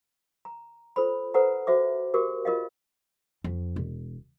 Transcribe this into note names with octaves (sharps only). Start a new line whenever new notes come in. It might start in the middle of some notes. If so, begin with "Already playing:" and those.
A#5
F4 A4 C5 B5
A4 B4 C5 F#5 A#5
F#4 C5 E5 D6
F#4 G4 A#4 D6
F4 A#4 D#5 F5
F2
E1